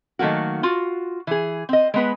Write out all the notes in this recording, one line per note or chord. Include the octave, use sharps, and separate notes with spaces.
D#3 F#3 A3 A#3 F#4
F4 F#4
E3 G#4
C4 D#5
G#3 B3 B4